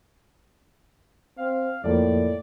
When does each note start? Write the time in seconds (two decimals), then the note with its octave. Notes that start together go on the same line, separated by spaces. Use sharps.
1.38 C4 F5
1.84 F2 A2 F3 A#3 D5